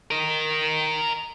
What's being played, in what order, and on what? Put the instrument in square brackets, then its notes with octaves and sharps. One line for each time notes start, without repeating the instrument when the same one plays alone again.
[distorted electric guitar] A#4 D#5